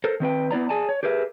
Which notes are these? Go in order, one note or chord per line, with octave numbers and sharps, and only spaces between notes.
A4 A#4 C5
D#3 C4 B4 G5
B3 E4 D5 A#5
G#4 D5 G#5 A5
C#5
G4 G#4 A#4 B4 E5